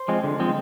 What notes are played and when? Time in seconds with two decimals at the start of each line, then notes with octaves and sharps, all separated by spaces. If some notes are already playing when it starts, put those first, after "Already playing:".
Already playing: C5
0.08 F3 G#3 C4
0.24 D3
0.40 F3 G#3 C4